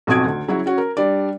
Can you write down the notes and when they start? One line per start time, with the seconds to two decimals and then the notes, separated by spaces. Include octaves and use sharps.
0.07 B1 F2 F#4 D#6 G#6 D7
0.25 D2
0.48 C#3 F#3 E4 F#4
0.66 C#4 F#4
0.78 A#4
0.97 G3 D4 D5